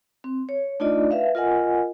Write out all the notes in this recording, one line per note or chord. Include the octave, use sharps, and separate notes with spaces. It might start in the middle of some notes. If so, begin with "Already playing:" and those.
C4
C#5
A3 D4 D#4 F4 D5 D#5
B4 E5 F5
F4 A#4 D#5 F#5 G#5